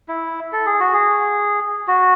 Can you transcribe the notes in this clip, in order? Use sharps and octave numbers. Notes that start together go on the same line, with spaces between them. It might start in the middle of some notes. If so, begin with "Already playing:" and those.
E4
A4
G#4
F#4
G#4
F#4